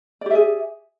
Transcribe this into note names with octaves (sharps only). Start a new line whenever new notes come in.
G4 G#4 D5 E5